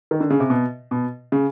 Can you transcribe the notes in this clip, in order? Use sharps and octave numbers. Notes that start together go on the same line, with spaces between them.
D#3
D3
C#3
C3
B2
B2
C#3